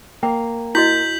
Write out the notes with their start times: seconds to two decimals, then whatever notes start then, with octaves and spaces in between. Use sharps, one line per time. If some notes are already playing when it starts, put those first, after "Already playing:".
0.23 A#3 G5
0.75 E4 F#4 D#5 G6 B6 F#7